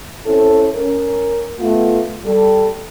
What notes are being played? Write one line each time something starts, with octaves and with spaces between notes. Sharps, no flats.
C4 C#4 E4 A4
C#4 A#4
A3 B3 F4
G3 A4